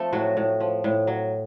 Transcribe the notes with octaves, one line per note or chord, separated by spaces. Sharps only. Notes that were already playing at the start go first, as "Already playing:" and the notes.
Already playing: F3 A3 C4 A4
A2 F#3 F#4
A2
F3
A2
F#3